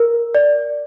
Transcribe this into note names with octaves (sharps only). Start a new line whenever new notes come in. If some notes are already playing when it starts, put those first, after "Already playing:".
Already playing: A#4
D5